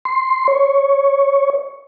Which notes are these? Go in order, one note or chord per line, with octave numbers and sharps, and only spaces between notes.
C6
C#5